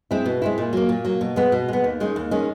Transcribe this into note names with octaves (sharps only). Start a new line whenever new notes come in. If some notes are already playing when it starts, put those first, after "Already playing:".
G#3 C4 E4
B2
G#3 C4 E4
A#2
F#3 A#3
A#2
F#3 A#3
B2
G#3 B3
B2
G#3 B3
D#2
D#3 G#3 C#4
D#2
D#3 G#3 C#4